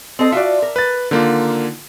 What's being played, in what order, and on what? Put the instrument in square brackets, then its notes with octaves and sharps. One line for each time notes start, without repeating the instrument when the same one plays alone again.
[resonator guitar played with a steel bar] C4 A4 D#5
[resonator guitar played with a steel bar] F4 F#4 D5 [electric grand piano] E5
[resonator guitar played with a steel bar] A#4
[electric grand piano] B4 A6
[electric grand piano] D3 A#3 F4 [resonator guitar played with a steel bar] D#3